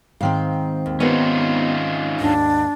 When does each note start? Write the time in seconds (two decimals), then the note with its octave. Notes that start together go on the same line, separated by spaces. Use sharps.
0.21 G#2 D#3 C4 F5
0.86 D#2
1.00 B3 C#4 D#4 F4 G4 A#4
2.20 D#2 G#2 D4